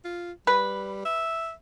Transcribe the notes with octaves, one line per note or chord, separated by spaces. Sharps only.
F4
G3 B4
E5